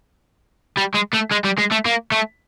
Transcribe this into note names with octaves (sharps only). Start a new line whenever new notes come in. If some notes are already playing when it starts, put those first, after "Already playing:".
G3
G#3
A3
G#3
G3
G#3
A3
A#3
A3